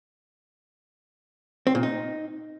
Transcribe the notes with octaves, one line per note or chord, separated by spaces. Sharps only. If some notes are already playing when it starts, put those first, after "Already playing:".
C4
A#2
D#4